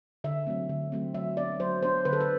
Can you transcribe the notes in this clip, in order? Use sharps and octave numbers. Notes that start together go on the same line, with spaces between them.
D3 E5
F#3 A3 C4
D3
F#3 A3 C4
F#3 E5
B3 D4 D5
F#3 C5
B3 D4 C5
D3 B4
A4
B4